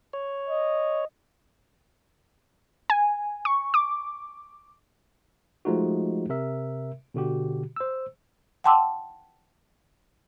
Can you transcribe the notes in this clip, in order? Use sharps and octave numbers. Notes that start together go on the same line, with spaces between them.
C#5
D#5
G#5
C#6
D6
F3 G#3 A3 D#4 F4 F#4
C3 A#4 E5
B2 D3 F#4 G4
C5 E6
F#5 G5 A5 C6 D6 E6